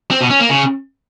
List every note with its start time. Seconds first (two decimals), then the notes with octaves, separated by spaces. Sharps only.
0.11 C4
0.21 B2
0.30 C#4
0.40 A#3
0.49 C#3